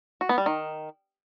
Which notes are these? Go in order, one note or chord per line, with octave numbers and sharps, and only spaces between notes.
F#4
B3
G3
D#3